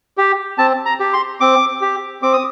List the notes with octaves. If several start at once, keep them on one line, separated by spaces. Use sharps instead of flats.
G4
C4 A5
A#5
G4
C6
C4 D6
G4
C4 D6
D#6